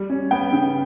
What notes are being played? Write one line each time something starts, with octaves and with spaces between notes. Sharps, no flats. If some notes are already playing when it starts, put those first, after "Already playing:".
Already playing: G3
C#4
B3 G5
C#3